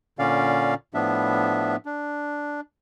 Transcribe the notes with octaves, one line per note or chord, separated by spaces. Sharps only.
A#2 D3 C#4 D5 F5
A2 F3 B3 D4 E5
D4